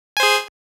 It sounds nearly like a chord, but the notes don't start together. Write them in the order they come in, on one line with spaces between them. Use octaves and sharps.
G#5 C5 G#4